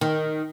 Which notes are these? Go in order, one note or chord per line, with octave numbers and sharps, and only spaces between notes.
D#3